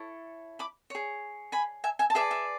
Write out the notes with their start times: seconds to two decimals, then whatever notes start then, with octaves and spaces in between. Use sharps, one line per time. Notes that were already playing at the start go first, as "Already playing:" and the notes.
Already playing: E4 A4 C#5
0.59 B5 D6
0.90 G#4 C#5
1.52 G#5 B5
1.84 E5 G#5
1.99 E5 G#5
2.10 A5
2.15 G#4 B4 D5 E5 G#5
2.31 E5